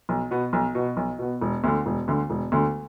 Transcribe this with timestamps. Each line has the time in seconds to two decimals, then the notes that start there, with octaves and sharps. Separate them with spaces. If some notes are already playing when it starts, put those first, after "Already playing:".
0.09 B1
0.31 B2 B3
0.53 B1
0.75 B2 B3
0.97 B1
1.19 B2 B3
1.41 E1
1.64 D2 D3
1.86 E1
2.08 D2 D3
2.30 E1
2.52 D2 D3